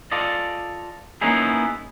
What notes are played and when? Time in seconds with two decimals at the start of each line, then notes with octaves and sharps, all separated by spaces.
0.12 F4 A4 D5 D#5
1.21 A#3 B3 C#4 D#4 E4 G#4